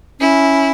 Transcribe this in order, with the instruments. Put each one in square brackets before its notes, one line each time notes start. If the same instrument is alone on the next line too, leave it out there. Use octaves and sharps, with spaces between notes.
[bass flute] C#4 [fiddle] E4